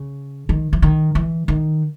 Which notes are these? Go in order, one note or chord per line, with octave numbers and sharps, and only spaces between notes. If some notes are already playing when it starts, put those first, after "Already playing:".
Already playing: C#3
D#3
E3
D#3
E3
D#3